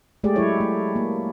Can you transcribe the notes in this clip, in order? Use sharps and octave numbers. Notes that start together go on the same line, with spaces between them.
G#3 A3 G4 G#4 D5
F#3 E4 C#5
A3
A#3